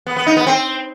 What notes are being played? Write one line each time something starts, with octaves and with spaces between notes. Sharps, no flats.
B3
B3
D#4
B3
C4